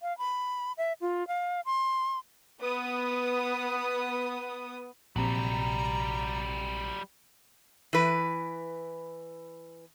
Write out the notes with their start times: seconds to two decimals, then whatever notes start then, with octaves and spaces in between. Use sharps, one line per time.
0.01 F5
0.18 B5
0.78 E5
1.01 F4
1.28 F5
1.65 C6
2.61 B3 D#6
5.16 A#1 C3 F#3 G3 A#5
7.93 E3 B4